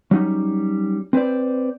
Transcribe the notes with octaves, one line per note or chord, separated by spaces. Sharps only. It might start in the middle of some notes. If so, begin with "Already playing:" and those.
F#3 G3 C#4 D#4
C4 B4 C5 D5